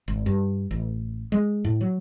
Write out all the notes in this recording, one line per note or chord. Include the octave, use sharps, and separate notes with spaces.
G#1
G2
A1
G#3
A2
F#3